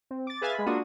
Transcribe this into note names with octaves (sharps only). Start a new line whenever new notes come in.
C4
D6 A6
G#4 B4 E5 F5 G#5 A6
G#3 B5
A#3 D4 F4 F#4 D#6